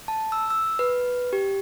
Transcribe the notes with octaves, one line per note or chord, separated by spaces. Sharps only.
A5
E6
E6
B4
G4